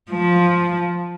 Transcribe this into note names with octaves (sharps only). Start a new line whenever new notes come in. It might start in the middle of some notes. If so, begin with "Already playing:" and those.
F3